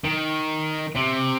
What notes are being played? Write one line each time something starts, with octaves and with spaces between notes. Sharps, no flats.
D#3
C3